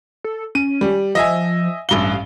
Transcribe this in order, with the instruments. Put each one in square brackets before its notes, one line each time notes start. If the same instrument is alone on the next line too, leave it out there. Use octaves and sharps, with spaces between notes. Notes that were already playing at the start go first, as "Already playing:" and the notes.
[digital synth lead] A4
[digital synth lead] C#4 [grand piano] D#7
[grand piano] G3
[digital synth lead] F3 [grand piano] D#5 E5 G#5
[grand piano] A1 G2 G7 [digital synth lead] F5